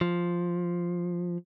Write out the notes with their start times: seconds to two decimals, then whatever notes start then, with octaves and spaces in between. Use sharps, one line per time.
0.01 F3